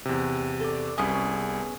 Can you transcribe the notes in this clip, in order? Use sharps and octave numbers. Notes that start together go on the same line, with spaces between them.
E2 C3
A4 D5
C2 B3 C#4 G#4 G#5